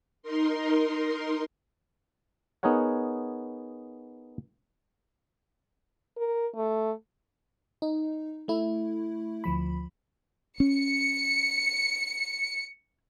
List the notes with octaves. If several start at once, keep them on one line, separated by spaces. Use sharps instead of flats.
D#4 A#4 C6
B3 D#4 G#4 A#4 C#5 F#5
A#4
A3
D#4
A3 E4
D2 F3 B5
C#4 C#7